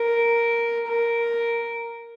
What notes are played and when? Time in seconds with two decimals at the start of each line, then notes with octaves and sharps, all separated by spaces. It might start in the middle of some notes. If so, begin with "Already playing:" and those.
Already playing: A#4
0.87 A#4